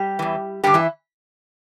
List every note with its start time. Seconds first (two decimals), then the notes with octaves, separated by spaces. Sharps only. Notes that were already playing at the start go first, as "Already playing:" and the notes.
Already playing: G3 G4
0.19 E2 E3
0.64 G2 D3 G3 G4
0.74 E3 E4